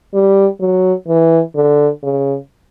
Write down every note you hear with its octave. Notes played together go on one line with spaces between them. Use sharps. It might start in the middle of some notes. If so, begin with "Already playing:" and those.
G3
F#3
E3
D3
C#3